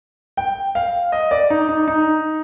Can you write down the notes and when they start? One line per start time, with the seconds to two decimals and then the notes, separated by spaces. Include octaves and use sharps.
0.37 G5
0.75 F5
1.12 D#5
1.31 D5
1.50 D#4
1.69 D#4
1.88 D#4